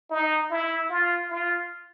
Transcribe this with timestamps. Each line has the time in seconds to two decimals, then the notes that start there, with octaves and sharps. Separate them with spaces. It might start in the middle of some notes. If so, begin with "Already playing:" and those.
0.10 D#4
0.50 E4
0.90 F4
1.30 F4